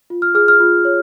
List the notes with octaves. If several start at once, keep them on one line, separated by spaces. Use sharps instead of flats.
F4
F6
G#4 F6
F6
F4
C#5